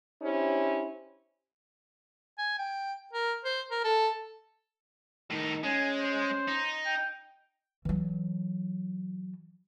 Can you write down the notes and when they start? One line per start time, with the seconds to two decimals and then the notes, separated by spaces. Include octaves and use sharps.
0.22 C#4 D4 E4 G4 C5
2.38 G#5
2.58 G5
3.13 A#4
3.45 C5
3.70 A#4
3.84 A4
5.31 A2 D#3 D#4
5.64 G#3 C#4 G#5
6.00 C5
6.48 D#4
6.86 G5
7.85 E3 F#3